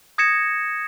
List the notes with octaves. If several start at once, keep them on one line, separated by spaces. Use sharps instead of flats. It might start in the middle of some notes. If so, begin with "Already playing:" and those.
D#6 G#6 A#6 C#7 E7